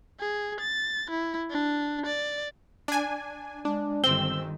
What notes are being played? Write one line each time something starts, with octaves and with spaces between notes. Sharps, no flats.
G#4
A6
E4
D4
D5
D4 G#5
G#3 D4
G1 D#3 C4 E6 G7